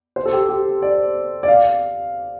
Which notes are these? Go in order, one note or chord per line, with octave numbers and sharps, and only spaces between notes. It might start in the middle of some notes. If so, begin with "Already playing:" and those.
C5
A4
G4
G4
D5
D5
F5